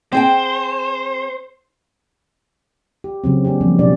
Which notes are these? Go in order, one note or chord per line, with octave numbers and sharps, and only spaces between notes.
C4 G#4 C5 G5
G4
C#3 F#3 C4
A#3 C#4 D4 G4
F3 G3 A#3 C4
B2 D4 D5